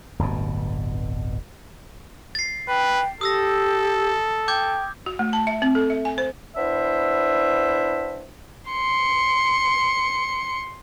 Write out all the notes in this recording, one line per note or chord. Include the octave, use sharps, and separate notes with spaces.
D1 G1 G2 B2
A6 C7
B4 G5
G4 A4 D#6 E6 A#6
G5 D6 G6 G#6
F#4
A3
A5
E5
C4
A4
E5
G#5
C5
B3 D4 E4 C5 E5
C6 C#7